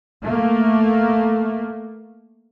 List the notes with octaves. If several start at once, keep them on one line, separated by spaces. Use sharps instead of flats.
A3 A#3